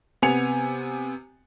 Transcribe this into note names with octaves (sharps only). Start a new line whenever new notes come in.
C3 B3 G#5 C#7 F7